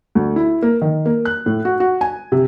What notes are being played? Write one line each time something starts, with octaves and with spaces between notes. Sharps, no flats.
D2
E4
A#3
D#3
A#3
F#6
A2
F#4
F#4
G#5
C3